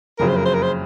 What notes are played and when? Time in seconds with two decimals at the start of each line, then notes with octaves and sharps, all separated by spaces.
0.18 F#1 F2 C#3 F#3 A#4
0.28 C5
0.37 A#4
0.45 C5
0.54 A#4
0.63 C5